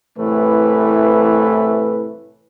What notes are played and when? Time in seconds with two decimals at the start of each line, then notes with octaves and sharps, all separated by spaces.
0.17 C2 A2 E3 A3 B4